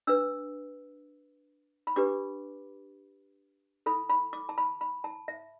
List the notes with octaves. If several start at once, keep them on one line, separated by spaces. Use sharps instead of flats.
D4 B4 E6
B5
D4 G4 B4 D6
E4 A4 B5
B5
D6
A5
B5
B5
A5
E5